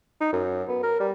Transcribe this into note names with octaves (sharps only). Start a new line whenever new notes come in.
D#4
F#2
B3
A#4
G3